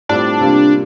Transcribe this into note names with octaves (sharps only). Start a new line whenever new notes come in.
A2 G3 C4 D4 F4
C3 G3 A#3 F4